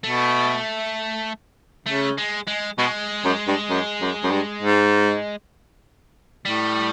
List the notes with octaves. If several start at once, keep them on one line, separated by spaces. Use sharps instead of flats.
B2 A3
C#3 A3
G#3
G#3
B2 G#3
F#2
G2
F#2
F#2
F#2
G2
G#2
A2 G3